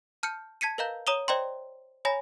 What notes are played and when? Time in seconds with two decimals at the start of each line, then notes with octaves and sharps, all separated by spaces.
0.23 A5 F6 G6 C#7
0.61 A5 G#6 B6 C#7 D#7
0.78 A#4 B4 D#5 F5 A#5 G6
1.07 C#5 A#5 D#6 D#7 F7 G7
1.28 C5 D5 D#5 G5 A#5 C6
2.05 C#5 G#5 A#5 B5 A#6